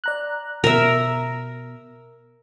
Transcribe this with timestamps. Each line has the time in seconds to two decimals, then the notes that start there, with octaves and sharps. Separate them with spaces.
0.04 D5 A#5 F#6
0.64 B2 A#4 E5